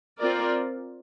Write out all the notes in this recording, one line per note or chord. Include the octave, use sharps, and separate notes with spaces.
C4 F4 A#4 D5